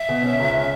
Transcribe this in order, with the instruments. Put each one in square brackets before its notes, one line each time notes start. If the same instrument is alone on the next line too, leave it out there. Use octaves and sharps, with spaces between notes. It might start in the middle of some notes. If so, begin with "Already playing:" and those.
Already playing: [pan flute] E5
[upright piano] B2
C#4
C#2
C#4